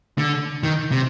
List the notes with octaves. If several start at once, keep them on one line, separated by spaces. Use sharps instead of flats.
D3
D#3
C3